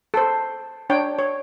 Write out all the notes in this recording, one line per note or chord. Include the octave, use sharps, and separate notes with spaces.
A4 C5
D4 C#5 G5
C#5